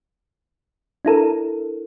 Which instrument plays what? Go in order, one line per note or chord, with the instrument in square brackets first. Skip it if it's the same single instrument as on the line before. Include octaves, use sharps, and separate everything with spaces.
[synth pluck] D4 E4 A4 A#4